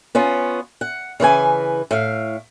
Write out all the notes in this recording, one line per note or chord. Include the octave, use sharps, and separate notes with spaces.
B3 C#4 F4
F#5
C#3 E3 B4 G#5
A2 F5